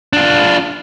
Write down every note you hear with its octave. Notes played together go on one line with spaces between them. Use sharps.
D4 F4